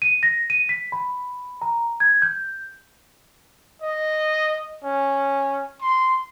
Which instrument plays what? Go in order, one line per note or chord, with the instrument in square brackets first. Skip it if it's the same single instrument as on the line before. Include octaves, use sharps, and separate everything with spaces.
[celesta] D#7
A#6
D#7
B6
B5
A#5
G#6
G6
[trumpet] D#5
C#4
C6